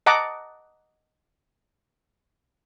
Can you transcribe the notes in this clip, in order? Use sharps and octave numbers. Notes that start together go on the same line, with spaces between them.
D#5 F#5 A5 A#5 D6